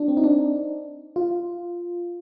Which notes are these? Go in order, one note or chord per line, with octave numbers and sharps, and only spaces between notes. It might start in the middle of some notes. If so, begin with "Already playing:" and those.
Already playing: D4
C4
D#4
D4
F4